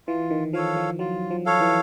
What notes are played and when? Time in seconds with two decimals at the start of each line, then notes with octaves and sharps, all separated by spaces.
0.07 E3 F4
0.31 D#3
0.53 F3 A4 C#5 F5
0.76 F3
0.99 F#3 F4
1.30 F3
1.46 A4 C#5 F5
1.61 E3